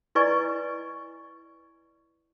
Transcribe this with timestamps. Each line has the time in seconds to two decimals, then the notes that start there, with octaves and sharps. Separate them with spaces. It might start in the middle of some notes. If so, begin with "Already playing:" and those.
0.15 E4 B4 D5 D#5 G#5 C#6